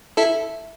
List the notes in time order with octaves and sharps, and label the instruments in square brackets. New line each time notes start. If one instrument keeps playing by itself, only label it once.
[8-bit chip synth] E4 A4 [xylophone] E5